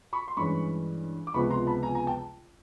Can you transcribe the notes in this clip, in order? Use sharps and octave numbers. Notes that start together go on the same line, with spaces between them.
B5 C#6
C6
G2 E3 G#3 C#4 B5 C#6
D6
C#2 C3 F3 G#3 B3 B5 C#6
A#5 C6
A5 B5
G#5 A#5
G#5 A#5
G5 A5